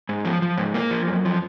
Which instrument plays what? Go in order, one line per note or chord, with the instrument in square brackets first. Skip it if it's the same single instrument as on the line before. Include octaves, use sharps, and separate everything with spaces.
[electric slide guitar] G#2
F3
F3
G#2
A#3
F3
F#2
F3